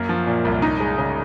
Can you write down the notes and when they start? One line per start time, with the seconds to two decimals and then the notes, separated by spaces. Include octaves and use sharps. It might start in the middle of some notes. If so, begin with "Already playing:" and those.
Already playing: F#2 A#3
0.09 F3
0.27 A#2
0.45 C2
0.62 D#4
0.80 G#3
0.98 C#3